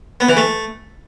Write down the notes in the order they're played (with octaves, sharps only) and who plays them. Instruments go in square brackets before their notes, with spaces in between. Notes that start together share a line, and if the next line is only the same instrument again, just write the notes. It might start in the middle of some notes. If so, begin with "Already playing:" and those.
[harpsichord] B3
E3
A3